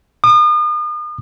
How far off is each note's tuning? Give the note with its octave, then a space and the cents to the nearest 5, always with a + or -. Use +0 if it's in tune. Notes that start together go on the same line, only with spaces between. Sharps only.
D#6 -40